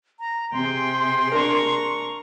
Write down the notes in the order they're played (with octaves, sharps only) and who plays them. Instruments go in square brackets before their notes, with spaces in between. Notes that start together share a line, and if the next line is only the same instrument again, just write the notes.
[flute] A#5
[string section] C3 G#4 [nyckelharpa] G5 [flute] C6
[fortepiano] D4 A#4 [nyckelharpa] A#5 C#6